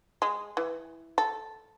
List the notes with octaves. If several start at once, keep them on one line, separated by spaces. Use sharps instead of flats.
G#3
E3
A4